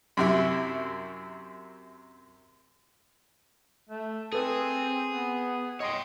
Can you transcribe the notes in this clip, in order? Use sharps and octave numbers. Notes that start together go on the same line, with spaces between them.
F#2 C3 E4
A3
C4 G#4 A4 B4 D#6
B3
C#5 D#5 G5 C6 D#6